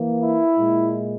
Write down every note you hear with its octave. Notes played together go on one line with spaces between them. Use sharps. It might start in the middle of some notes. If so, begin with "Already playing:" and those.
Already playing: E3 A#3
E4
A#2 G#3